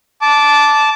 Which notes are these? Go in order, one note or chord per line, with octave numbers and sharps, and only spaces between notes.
A5 D6